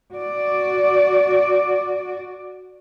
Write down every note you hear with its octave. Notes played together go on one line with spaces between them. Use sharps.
F#4 D5